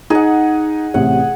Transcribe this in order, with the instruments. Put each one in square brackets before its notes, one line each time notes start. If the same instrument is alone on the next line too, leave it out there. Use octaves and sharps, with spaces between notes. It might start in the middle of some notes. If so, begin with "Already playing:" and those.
[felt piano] D#4 [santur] G#4 F#5
[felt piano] A1 C3 [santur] F#5